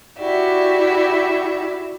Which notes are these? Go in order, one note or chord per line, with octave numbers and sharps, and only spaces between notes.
E4 F#4 G4 D5 E5